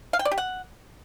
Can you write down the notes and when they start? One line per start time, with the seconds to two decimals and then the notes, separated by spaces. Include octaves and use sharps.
0.13 F5
0.19 G5
0.25 D5
0.31 G4
0.38 F#5